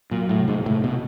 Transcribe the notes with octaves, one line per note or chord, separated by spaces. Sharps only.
A#2 F#3
A2
C3
G#2
A2 C3
B2